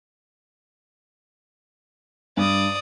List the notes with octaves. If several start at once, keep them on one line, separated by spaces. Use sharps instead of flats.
G2 D5 D#6